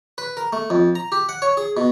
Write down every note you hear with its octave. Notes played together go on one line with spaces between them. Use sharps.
B4
A#4
A3
F2
A#5
G4
F#5
C#5
G#4
B2